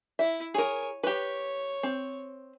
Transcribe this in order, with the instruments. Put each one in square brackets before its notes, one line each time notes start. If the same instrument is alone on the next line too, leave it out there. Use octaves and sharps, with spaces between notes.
[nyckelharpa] E4 [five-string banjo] E5
[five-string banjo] G#4 A#4 [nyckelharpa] C#5 G#5
[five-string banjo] G4 B4 [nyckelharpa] C#5
[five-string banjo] C4